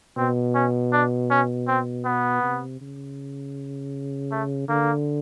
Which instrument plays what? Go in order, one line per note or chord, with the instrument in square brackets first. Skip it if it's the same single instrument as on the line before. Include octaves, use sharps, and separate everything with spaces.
[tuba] B2 [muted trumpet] C4
[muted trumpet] C#4
D4
C#4
C4
B3
[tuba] C3
C#3
[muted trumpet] A3
[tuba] D3 [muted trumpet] A#3